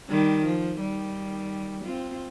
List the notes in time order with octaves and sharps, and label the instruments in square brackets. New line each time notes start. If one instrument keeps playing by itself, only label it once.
[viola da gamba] D#3 G3
F3
D#3 G3
C4 F4